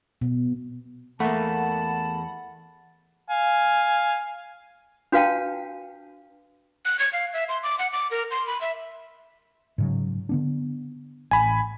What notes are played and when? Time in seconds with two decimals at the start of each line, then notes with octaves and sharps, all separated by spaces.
0.21 B2
1.20 E2 A3 A#3 F#5 A5 B5
3.30 F5 G#5
5.12 D4 F#4 B4 F5 G5 A5
6.85 F#6
6.99 G#6
7.13 F5
7.33 E5
7.49 C6
7.63 D6
7.79 F#5
7.92 D6
8.11 A#4
8.31 C6
8.47 B5
8.61 E5
9.78 G#2 C#3 F#3
10.29 D3 B3 D4
11.31 A1 G#5 B5